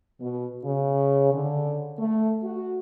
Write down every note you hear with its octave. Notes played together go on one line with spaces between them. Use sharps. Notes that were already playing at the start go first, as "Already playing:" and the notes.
B2
C#3
D3
A3
F#4